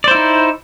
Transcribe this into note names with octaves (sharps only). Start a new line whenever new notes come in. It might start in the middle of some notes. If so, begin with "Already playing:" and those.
D#4 E4 C5 D5